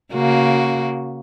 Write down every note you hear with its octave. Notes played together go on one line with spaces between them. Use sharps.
C#3 A#3 F#4